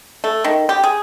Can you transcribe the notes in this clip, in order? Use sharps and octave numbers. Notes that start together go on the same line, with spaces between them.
A3
D#3
G4
G#4